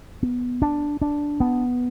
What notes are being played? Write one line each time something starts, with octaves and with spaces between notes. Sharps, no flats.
B3
D4
D4
B3